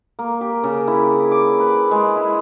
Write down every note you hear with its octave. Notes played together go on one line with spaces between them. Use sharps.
A#3
G4
C#3
E4
D6
B4
G#3
E4